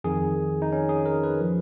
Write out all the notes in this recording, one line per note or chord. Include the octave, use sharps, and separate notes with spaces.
F2 D#3 G#4
D#4
C#4
G#4
A#4
B4
F3